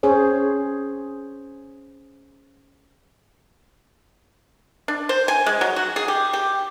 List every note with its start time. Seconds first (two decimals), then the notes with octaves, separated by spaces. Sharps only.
0.03 C#4 G#4 C5 C#5
4.88 D4
5.09 C5
5.28 G#5
5.46 G#3
5.61 F#3
5.76 F#4
5.96 G#4
6.08 G4
6.33 G4